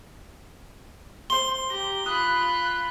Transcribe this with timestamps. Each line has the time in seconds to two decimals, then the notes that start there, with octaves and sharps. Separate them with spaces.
1.30 C5 C6 G7
1.70 G4 A#5
2.06 F4 B5 D#6 F#6